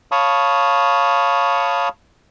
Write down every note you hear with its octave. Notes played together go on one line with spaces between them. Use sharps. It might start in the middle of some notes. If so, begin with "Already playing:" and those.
C#5 F5 A5 B5 C#6 D#6